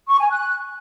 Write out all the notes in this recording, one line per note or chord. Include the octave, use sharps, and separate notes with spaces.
C#6
G#5
F#6